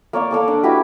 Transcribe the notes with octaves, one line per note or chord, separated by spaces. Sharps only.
A#3 C#5 D5 F5
A#3 A4 D5
D4
E4 F#4 G4 B4